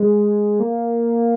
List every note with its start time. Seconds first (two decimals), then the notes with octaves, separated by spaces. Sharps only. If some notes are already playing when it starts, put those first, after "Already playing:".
Already playing: G#3
0.60 A#3